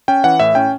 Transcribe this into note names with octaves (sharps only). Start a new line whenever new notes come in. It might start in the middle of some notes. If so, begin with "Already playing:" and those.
C#4 G5
E3 F#5
A2 E5
C#4 G5